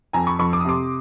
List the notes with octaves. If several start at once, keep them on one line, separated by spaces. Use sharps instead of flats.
F2 G#5 A#5
B5 C#6
F2 B5 C#6
D6
D#6
C3 C6 D6